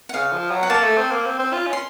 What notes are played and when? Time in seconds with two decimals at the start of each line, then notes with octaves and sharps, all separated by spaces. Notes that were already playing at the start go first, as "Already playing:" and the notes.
0.09 F#5
0.14 C#3 F5
0.32 F3
0.51 F#3
0.63 F#5
0.69 A#3 A5
0.83 A3
0.97 C4
1.11 A#3
1.25 C4
1.39 C4
1.53 F4
1.67 C#4
1.73 C6